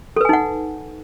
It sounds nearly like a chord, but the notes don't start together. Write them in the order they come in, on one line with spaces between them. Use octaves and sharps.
A4 B4 G#5 D#4 F#5